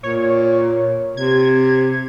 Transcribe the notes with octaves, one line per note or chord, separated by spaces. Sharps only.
A#2 C#5
C3 G#6